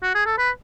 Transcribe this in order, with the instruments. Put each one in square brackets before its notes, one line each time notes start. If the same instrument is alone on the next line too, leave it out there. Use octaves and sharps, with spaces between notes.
[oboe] F#4
G#4
A4
B4